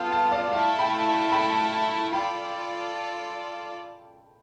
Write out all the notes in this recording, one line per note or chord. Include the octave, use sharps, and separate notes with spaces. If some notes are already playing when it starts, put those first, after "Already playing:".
Already playing: B3 F4 A4 F5 G5 A5
F5 A5
D5 F5
A3 E4 A4 F5 A5
G5 B5
G5 B5
F4 A4 D5 G5 B5